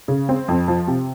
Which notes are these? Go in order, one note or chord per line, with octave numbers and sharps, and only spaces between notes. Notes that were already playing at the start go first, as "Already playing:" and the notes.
C#3
C4
F2
F3
C3